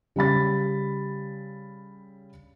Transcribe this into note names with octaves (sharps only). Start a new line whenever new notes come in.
C#3 G3 B5 A6